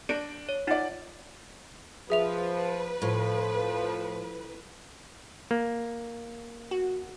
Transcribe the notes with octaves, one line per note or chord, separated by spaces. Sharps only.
D4 D5 A#6 D7
C#5
D#4 F4 D5 F#5
F3 G#4 B4 E5 F7
A2 F3
A#3
F#4